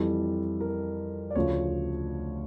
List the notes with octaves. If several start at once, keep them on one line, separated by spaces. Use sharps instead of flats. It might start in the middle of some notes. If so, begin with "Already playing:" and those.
Already playing: F2 E3 G3 A4
A#4
D5
D2 C#3 F3 C#5